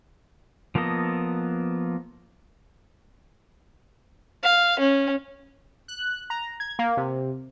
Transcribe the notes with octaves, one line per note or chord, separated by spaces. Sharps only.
F3 A#3 B3 A4 D#5
F5
C#4
F#6
A#5
G#6
A#3
C3